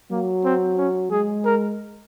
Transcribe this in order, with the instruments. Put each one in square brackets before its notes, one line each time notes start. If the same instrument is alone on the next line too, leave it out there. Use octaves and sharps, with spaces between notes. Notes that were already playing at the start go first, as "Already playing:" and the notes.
[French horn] F#3 [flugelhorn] A#3
[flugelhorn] C4
C#4
[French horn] G#3 [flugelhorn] G#4
[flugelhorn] A#4